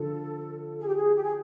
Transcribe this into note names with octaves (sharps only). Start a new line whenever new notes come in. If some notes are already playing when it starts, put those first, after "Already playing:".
Already playing: D3 F3 A4
G#4
G4
G#4
G4
G#4